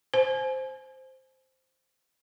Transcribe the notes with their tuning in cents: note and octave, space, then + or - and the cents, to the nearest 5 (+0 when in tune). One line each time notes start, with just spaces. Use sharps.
C5 +0 G#5 +35